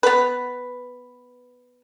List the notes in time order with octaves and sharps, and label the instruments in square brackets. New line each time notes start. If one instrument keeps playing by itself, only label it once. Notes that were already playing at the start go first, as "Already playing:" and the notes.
[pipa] B3 B4